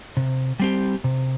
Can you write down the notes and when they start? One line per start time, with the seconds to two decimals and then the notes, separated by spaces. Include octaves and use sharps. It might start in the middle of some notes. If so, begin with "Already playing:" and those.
0.17 C3
0.60 G3 C4 G4
1.04 C3